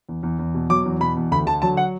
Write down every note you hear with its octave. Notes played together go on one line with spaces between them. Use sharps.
E2
E2
E2
B2
F#3 D6
E2
B2 B5
E2
D2 B5
D3 A5
F#3 A5
F#5